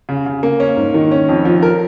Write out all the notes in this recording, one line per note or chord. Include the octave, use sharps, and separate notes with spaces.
C#3
C#3
A#3
C#4
G#2
D#3
C#4
F2
F3
A#4